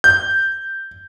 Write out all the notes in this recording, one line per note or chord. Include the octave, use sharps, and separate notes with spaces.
G6